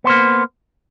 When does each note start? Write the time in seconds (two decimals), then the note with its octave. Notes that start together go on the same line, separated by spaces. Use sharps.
0.04 B3
0.07 C5
0.10 A#3